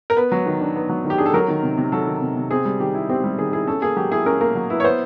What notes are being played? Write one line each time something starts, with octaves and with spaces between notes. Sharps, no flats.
A#4
B3 B4
F#3
D#3
D4
B3
F#3
D#3
G4
D4 G#4
A4
F#3 A#4
D#3
C3
C3
F#3 A4
D#3
C3
C3
C4 G#4
G3
D#3 G4
E4
C4 G4
G3
D#3 G#4
E4 G#4
C#4 A4
A#3 G#4
F#3 G4
E4 G#4
C#4 A#4
A#3 A#4
F#3
E4 B4
C#5
B3 C5